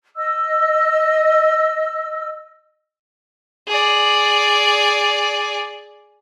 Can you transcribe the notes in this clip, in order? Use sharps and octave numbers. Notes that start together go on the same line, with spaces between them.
D#5 E6
G#4 D5